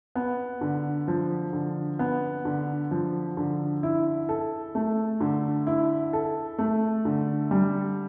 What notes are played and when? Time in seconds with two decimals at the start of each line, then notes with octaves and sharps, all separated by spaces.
0.15 B3
0.61 D3
1.08 F3
1.53 D3
1.99 B3
2.45 D3
2.91 F3
3.37 D3
3.83 E4
4.29 A4
4.75 A3
5.20 D3
5.67 E4
6.13 A4
6.58 A3
7.05 D3
7.51 G3